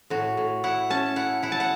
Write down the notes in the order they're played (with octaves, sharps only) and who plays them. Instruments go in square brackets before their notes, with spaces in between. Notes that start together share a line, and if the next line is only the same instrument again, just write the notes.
[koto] A2 F#4
A2
E4 F#5
C#4 A5
E4 F#5
E4 F#5
A5
F#5